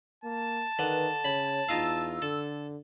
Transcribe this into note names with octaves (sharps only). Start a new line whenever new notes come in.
A#3 A5
D3 D#3 B4
C#3 C#5 B5
E2 D#4 F4 F5 E6
D3 A4